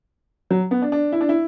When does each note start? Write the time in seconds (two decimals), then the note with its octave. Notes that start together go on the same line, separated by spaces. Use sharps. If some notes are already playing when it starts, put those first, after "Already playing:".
0.50 F#3
0.71 B3
0.82 D4
0.92 D4
1.12 E4
1.21 D4
1.29 E4